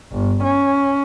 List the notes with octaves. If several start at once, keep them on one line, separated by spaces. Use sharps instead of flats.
G1
C#4